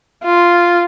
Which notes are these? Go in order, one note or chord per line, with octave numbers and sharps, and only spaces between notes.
F4